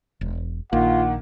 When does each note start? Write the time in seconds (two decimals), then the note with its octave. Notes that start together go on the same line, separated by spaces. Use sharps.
0.21 E1
0.73 A#1 D#3 A#3 F4 F#5